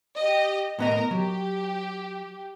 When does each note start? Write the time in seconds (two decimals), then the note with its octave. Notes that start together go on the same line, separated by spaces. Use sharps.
0.16 G4 D#5
0.79 A2 B3 A#4 D#5 A#5
1.11 F#3 G4